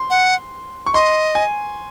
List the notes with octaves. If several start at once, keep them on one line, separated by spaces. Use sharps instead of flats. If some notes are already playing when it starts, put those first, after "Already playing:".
Already playing: C6
F#5
C#6
D#5 C6
G#5